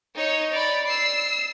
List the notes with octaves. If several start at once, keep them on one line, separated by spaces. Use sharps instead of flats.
D#4 C#5
D5 B5
E6 C7